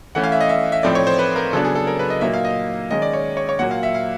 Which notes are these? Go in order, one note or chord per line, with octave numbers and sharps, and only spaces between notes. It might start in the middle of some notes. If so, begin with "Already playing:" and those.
E3 A3 C#4 F#5
F5
E5
D#5
E5
E5
A2 F3 A3 C4 D#4 D5
C#5
C5
B4
A#4
C#3 F#3 B3 D4 A4
G#4
A4
A#4
B4
D#5
A#2 F#3 A#3 D#4 E5
F5
D#5
D#3 G#3 C#4 D#5
D5
C#5
C#5
C#5
A#2 F#3 A#3 F#5
F5
E5
F5